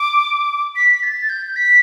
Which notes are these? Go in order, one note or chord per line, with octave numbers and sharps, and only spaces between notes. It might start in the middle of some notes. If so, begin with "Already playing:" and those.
Already playing: D6
B6
A6
G6
B6